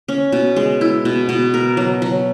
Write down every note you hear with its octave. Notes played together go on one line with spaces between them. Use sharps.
C#4
B2
G#3
E4
B2
B2
A#4
F#3
F#3